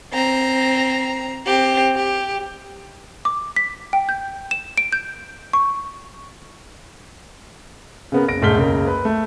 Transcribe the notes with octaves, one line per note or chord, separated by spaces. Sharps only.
C4 A#5
C4 G4
G4
D6
B6
G5
G6
E7
D7
G6
C#6
C#3 B3 A#4
F#1 A#6 D7
E1 G#2 A3 F6 B6 G7
F#1 C#2 A#4
B4
A3